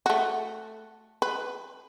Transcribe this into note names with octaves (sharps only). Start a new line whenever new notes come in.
A3 F#4
B4